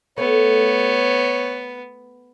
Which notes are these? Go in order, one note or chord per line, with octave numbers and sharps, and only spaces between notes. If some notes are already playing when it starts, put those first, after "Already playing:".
A3 B3 C#5